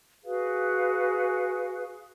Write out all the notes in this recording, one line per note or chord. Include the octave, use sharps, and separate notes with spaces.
F#4 G#4 B4 F5